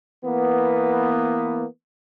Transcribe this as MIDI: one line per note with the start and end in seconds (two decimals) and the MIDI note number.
0.24 1.65 52
0.24 1.65 58
0.24 1.65 59